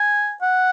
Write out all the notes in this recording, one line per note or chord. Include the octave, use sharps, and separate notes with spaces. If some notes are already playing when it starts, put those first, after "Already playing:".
Already playing: G#5
F#5